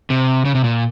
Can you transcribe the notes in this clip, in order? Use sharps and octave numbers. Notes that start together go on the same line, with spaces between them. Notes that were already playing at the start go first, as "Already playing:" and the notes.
C3
C#3
C3
A#2